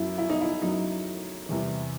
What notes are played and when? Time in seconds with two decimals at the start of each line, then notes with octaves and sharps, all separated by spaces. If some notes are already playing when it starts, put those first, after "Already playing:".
Already playing: F#2 F#3 E4
0.18 E4
0.30 D#4
0.41 E4
0.62 F#2 F#3 D#4
1.49 E2 C3 E3 G3